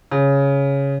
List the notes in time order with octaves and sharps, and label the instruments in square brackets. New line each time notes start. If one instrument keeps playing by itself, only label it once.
[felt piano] C#3